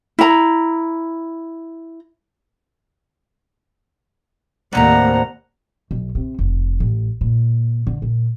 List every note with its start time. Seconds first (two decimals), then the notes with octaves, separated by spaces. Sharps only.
0.19 E4 A#5
4.73 D#2 A2 C3 A#3 D4 F#5 A#5
5.91 B1
6.15 C3
6.39 F1
6.80 A1
7.21 A#2
7.87 D3
8.02 A#2